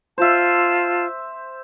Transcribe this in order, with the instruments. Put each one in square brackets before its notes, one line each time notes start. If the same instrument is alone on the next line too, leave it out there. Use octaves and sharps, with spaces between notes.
[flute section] F4 A5 [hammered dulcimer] C5 E5